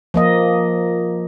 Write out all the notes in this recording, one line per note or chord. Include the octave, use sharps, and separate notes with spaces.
F3 A#3 D#5